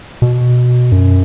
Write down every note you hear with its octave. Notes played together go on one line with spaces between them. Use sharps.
B2
F#2